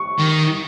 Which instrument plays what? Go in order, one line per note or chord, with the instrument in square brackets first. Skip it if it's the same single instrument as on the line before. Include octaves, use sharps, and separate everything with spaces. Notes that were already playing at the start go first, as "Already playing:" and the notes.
Already playing: [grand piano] C#6
[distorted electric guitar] D#3